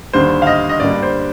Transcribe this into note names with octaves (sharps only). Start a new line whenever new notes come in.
D#2 D3 G3 C5
F5
D#5
D#5
G2 D3 G3 A#3 D5
C5